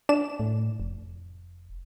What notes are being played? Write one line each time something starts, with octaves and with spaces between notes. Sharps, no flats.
D4 E7
A2
F1